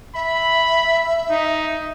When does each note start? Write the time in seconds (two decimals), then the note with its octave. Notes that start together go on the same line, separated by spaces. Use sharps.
0.15 E5 B5
1.30 D#4